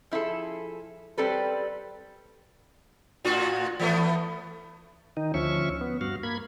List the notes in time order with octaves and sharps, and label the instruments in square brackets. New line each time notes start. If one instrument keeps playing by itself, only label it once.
[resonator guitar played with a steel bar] F3 E4 G#4 A4
G3 C4 A4 B4
[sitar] A2 F4 F#4
E3 A3 B3
[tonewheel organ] D#3 D#4
D2 F3 C#4 E5 C#6
B3
G2 F#4 F5
A#3 B5 G#6